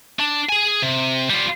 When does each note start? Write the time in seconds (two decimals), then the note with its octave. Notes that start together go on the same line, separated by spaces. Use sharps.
0.20 D4
0.49 G#4 G#5
0.82 C3
1.30 G3 F4